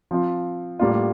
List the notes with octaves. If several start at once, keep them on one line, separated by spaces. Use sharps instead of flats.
F3 C4 F4
A2 G3 A#3 D4 F4